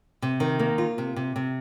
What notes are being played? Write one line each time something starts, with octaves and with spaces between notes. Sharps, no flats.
C3
D#3
A#3
F4
C3
C3
C3